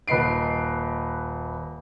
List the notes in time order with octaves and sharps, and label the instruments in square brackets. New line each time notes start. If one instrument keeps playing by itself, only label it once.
[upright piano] D#1 B4 D#5 C7 D7